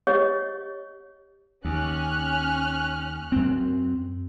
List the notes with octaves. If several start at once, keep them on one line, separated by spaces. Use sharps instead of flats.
G4 C#5 D#5
D#2 C#4 F6 F#6
F#2 C4